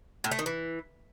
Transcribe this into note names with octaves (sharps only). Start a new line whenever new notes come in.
A2
A3
D#3
E3